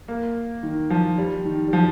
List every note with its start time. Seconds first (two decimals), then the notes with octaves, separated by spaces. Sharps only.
0.08 A#3
0.63 D#3
0.90 F3
1.18 G3
1.45 D#3
1.68 G3
1.73 F3